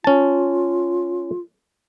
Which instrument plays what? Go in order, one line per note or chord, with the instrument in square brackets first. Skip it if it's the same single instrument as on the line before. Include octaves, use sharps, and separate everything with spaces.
[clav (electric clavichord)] C#4 A5 [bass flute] F4